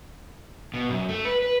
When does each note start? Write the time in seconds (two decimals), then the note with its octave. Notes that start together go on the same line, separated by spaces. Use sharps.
0.74 B2
0.89 F#2
1.09 A3
1.25 B4
1.42 B4